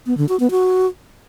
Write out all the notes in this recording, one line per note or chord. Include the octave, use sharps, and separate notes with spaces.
B3
D3
F#4
B3
F#4